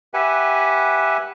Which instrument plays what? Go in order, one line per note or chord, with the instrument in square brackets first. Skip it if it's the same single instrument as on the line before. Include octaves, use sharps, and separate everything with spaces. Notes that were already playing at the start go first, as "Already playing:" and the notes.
[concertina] G4 B4 E5 F#5 G#5